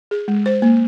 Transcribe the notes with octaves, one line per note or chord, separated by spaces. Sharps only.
G#4
G#3
C5
A#3